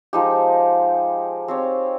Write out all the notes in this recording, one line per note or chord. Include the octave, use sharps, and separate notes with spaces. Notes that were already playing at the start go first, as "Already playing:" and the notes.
F3 G#3 D#4 G4
C4 G4 C#5